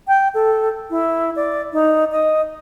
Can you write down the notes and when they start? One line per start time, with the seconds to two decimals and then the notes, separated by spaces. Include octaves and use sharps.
0.08 G5
0.34 A4
0.90 E4
1.36 D5
1.73 D#4
2.11 D#5